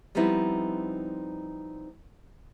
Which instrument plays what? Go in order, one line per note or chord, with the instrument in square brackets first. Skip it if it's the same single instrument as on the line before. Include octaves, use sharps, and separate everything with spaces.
[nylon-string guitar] F3 G3 B3 C4 D#4 E4